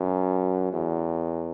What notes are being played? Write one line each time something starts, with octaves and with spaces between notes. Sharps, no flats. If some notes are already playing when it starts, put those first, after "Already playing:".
Already playing: F#2
E2